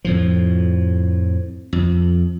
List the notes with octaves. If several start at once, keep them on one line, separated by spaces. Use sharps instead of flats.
F2 A2 F3
F2